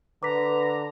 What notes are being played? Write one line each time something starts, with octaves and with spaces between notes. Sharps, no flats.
D3 B4 A#5 D6 B6